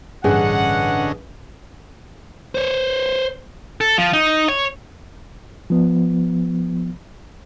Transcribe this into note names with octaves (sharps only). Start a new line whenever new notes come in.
A1 G2 D3 C#4 G#4 D#5 F#5
C5 C#5
A4
F3
D#4
C#5
F3 B3